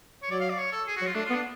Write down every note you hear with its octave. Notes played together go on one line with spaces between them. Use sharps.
C#5
F#3 D5
F5
D5
C#5
A4
G#4
F#4
F#3
F4
A3 D4
F4
B3
D4